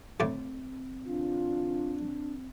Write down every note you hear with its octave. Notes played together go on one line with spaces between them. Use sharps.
D2 A2 C4 D5
D3 E3 D4 F4